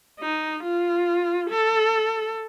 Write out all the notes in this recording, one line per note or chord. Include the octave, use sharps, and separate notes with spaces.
D#4
F4
A4